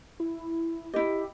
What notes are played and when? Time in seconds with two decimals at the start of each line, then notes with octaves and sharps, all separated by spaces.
0.20 E4
0.94 E4 G4 D#5